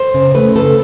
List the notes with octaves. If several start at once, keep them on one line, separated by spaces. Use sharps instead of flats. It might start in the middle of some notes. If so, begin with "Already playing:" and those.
Already playing: C5
C#3
A3 B4
C#3 A4